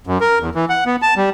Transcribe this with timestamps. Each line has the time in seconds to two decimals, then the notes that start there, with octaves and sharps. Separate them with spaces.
0.07 F#2
0.20 A#4
0.40 E2
0.55 E3
0.70 F#5
0.86 B3
1.02 A5
1.17 G3